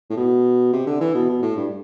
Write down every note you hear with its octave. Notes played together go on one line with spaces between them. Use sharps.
A2
B2
C3
D3
E3
B2
B2
A2
G2